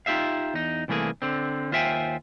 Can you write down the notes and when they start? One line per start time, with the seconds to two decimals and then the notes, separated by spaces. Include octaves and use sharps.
0.06 D#4 F4 G4 E5 F5
0.54 E2 D#4
0.88 C2 E3 A3 A#3 G#4
1.22 D3 C4
1.72 D#2 F4 C5 E5 G5 G#5